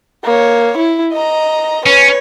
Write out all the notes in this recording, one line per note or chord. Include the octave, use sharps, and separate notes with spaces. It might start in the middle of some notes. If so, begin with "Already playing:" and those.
A#3 C#5
E4
D#5 A#5
C#4 B4 C#5